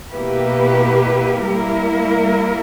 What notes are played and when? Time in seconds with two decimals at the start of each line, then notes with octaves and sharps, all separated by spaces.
0.12 B2 A#3 E4 G4 B4
1.48 G3 A#3 E4 A#4